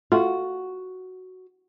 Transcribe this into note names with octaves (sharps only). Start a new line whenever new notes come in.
A3 F4 F#4